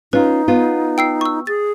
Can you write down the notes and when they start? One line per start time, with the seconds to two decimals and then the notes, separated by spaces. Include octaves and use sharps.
0.13 C#4 D#4 F4 B4
0.48 B3 F4
0.98 G5 E6 C7
1.21 C#6 E6
1.47 G#4 A6